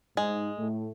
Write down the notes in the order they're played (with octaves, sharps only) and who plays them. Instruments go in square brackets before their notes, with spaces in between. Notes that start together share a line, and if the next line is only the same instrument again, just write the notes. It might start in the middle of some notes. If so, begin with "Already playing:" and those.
[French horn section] G#2 [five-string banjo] G#3
[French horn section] A2 A3